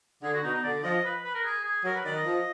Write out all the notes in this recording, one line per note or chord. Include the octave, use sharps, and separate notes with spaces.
D3 G#4
F#4
B2 D#4
D#4
D3 D5
F3 D#5
B4
B4
A#4
G#4
G#4
F#3 A#4
B4
D#3 D5
D#5
F3